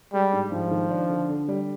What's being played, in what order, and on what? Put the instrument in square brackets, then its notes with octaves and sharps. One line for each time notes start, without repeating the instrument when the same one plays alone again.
[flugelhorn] G3 [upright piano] G#3
[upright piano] G#2
[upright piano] G#2 [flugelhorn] F3
[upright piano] D#3
D4
D3
D3
G3